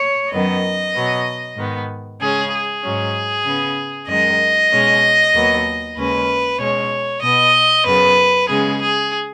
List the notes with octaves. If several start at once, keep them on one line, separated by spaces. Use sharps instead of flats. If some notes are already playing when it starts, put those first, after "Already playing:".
Already playing: C#5
F#2 D#3 F#3 B3 D#5
B2 F#3 B3
G#2 D#3 B3
C#3 G#3 C#4 G#4
G#4
G#2 F#3 C#4
C#3 B3
F#2 D#3 G#3 D#5
B2 G#3 C#4
D#2 D#3 F#3 B3
D#2 C#3 G#3 C#4 B4
B2 G#3 C#4 C#5
B2 B3 D#5
F#2 C#3 B3 B4
C#3 G#3 B3 G#4
G#4